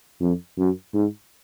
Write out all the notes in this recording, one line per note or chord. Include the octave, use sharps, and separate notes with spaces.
F2
F#2
G#2